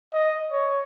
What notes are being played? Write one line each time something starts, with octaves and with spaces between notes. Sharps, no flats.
D#5
C#5